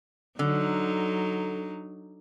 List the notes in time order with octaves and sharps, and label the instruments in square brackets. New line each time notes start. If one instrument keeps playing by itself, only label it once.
[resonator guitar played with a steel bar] D3 [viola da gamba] F#3 D#4